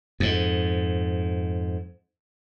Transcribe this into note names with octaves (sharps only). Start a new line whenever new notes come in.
F2 G#2